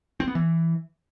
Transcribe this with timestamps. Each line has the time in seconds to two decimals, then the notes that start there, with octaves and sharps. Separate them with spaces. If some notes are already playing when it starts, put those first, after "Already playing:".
0.20 C4
0.28 B3
0.35 E3